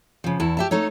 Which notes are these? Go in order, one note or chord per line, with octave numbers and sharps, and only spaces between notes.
C#3 F3
E2 E4 A5
G4 E5 A5
A3 D#4 A4 C#5